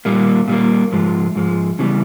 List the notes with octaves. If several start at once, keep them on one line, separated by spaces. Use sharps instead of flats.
A#2 G3 A#3
A#2 G3 A#3
G#2 F3 G#3
G#2 F3 G#3
C#3 E3 G3 B3